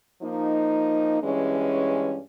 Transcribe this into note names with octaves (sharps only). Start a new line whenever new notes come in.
F3 A#3 D#4
G2 E3 G#3 C#4